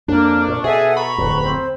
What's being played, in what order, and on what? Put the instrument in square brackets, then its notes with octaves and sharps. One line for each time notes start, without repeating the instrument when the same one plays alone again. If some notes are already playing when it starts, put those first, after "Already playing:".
[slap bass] F2 [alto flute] A#3 [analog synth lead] D4
[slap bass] A#2 [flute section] C#6
[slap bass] B2 [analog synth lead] G#4 [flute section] A4 E5 G#5 [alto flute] F#5
[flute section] A#5 C#6 [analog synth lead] B5
[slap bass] D1 F2 [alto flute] B4
[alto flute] C4